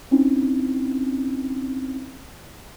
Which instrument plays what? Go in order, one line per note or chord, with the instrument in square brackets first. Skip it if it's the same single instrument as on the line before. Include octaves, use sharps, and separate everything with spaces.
[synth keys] C4 C#4 D#4 E4